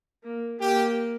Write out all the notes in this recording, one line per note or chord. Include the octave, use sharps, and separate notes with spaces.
A#3
A#3 G4